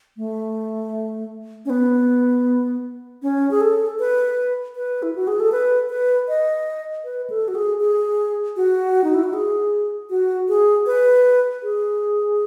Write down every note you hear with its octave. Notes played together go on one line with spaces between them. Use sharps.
A3
C#4
B3
C#4
G#4
A4
B4
B4
E4
F#4
G#4
A4
B4
B4
D#5
B4
A4
F#4
G#4
G#4
F#4
D#4
E4
F#4
G#4
F#4
G#4
B4
G#4